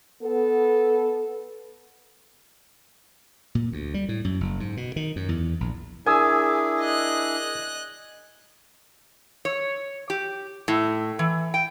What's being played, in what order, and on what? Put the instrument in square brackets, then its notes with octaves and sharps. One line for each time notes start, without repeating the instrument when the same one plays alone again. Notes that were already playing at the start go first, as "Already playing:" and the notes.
[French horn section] B3 A4
[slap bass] A#2
D2
G3
A2
F#2
F#1
G#2
B2
D#3
F#2
E2
A#1
[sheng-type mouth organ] D4 E4 G#4 [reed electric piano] A#4 D#6 E6 [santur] G#5
[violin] D#5 F#6
[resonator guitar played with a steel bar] C#5
G4
A2
E3
G5